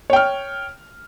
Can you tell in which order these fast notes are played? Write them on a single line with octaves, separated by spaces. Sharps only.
C#5 G5 F6